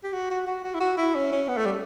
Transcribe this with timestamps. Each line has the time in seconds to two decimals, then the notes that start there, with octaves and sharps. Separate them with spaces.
0.04 G4
0.13 F#4
0.30 F#4
0.47 F#4
0.64 F#4
0.74 E4
0.80 F#4
0.98 E4
1.15 C#4
1.32 C#4
1.48 B3
1.57 A3
1.66 G3